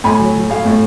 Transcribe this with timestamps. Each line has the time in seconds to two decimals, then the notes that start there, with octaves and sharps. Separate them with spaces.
0.04 A2 G#5 B5
0.19 F#3
0.35 F#3
0.50 A3 F5 G#5
0.65 A2